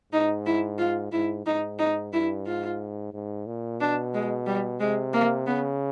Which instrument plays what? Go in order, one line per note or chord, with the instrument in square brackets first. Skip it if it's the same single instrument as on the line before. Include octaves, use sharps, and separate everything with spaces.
[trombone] G#2 [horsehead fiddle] D#4
[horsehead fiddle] E4
F4
[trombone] G#2 [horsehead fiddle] E4
[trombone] G#2 [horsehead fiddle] D#4
[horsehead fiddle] D#4
[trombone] G2 [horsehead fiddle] E4
[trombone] G#2 [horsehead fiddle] F4
[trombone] G#2
A#2
[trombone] B2 [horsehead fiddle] D4
[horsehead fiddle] G#3
G3
[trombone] C3 [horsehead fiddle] G#3
[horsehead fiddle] A#3
[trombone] C#3 [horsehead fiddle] B3